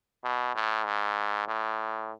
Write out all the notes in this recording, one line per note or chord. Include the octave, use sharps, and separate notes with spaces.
B2
A2
G#2
A2